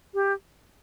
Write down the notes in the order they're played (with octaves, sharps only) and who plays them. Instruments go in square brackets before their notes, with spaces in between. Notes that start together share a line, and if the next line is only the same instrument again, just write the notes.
[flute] G4